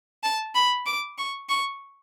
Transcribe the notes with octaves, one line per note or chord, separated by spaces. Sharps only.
A5
B5
D6
C#6
C#6